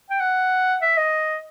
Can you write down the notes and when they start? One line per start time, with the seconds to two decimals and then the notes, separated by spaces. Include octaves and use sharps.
0.10 G5
0.20 F#5
0.82 E5
0.97 D#5